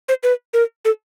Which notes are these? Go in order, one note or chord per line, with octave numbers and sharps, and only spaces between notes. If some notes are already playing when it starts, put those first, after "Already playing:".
C5
B4
A#4
A4